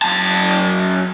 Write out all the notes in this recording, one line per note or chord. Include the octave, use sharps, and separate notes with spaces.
F#2 A5